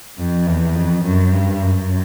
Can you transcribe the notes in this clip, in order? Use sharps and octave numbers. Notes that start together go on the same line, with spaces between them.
F2
E2
F2
F#2
G2
F#2